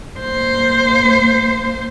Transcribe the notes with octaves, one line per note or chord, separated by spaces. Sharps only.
A#3 C5